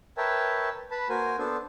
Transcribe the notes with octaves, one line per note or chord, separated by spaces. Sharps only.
A#4 B4 C#5 E5 G5 A5
B4 A5 B5
A#3 F#4 A#4 C5 G#5
B3 D4 A4 C5